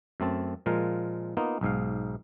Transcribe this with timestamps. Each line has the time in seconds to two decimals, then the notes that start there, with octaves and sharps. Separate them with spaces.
0.20 F#2 A3 C4 A5
0.66 A#2 F3 G#3 A#4
1.37 A#3 B3 D#4 F4
1.61 B1 G#2 F5